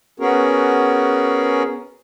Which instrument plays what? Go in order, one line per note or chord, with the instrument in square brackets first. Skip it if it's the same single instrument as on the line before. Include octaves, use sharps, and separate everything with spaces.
[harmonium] B3 C#4 F#4 G#4 A#4